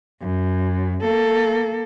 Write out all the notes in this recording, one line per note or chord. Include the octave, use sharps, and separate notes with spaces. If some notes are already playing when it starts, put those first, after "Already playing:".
F#2
A#3 A4